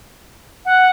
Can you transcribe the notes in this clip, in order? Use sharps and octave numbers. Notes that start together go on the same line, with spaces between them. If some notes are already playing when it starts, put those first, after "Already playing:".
F#5